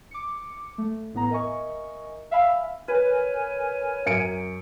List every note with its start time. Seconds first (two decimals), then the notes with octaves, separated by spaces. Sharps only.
0.11 D6 C#7
0.78 A3
1.13 A1 A2 B3 A#5
1.30 A#4 D#5 E5 G#5 C#6
2.31 E5 F5 G#5 B5 E6
2.88 A#4 B4 C#5 G#5
4.06 F#2 C#7 D7